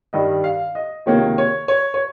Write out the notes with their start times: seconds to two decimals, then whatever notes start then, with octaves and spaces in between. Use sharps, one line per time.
0.13 G2 D#3 G3 D#5
0.44 F5
0.75 D#5
1.06 C#2 C3 D#3 A#3 C#5
1.38 C#5
1.68 C#5
1.94 C#5